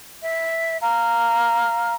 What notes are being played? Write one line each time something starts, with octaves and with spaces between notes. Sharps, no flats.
E5
F5 A#5 F6